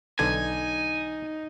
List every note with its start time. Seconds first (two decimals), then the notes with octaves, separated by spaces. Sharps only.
0.19 B1 D3 D#4 G#5 A5 G#6